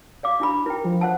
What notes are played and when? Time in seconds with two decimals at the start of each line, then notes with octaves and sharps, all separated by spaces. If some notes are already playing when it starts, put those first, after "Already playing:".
0.23 D5 F5 D6
0.40 D4 E4 B5
0.66 E4 A#4 G5
0.85 F3
1.01 C5 F#5 A5